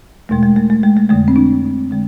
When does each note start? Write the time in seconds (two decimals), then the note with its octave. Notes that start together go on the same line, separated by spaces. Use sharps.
0.29 E2 B2 G#3 A3
0.43 G#3
0.56 A3
0.70 A3
0.83 G#3
0.97 A3
1.09 F2 D3 G#3 A3
1.28 C4
1.36 D4
1.91 D3 G#3